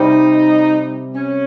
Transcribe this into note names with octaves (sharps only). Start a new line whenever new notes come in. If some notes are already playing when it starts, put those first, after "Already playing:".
Already playing: C3 G3 C4 D#4
C#4